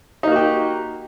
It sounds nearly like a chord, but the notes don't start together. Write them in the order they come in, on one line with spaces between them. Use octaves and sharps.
D#4 A#3 F#4 G4